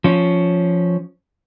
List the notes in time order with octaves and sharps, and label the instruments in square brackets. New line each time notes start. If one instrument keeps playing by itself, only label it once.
[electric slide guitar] F3 C#4